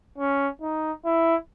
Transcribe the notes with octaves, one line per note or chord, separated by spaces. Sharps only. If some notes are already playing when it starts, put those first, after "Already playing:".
C#4
D#4
E4